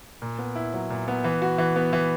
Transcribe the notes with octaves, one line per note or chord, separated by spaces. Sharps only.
A#2
B3
E4
F#3
A#2
B3
E3
F#4
E3
B3
E3